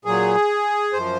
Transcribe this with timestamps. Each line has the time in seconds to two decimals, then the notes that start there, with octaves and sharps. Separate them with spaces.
0.05 A#2 F#3 G#4
0.93 F#2 F3 C5